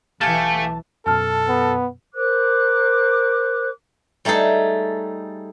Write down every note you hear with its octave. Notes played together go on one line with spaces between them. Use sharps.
B1 E3 A3 G4 F5 G#5 A5
F#2 B2 A4 A5 F6
B3
A#4 C5 D6 F#6
G3 A3 D#4 G#4 A4